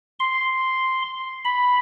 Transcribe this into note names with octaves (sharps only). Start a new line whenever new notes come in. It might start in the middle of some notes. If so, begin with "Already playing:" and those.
C6
B5